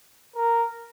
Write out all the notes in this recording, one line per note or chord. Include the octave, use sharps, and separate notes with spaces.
A#4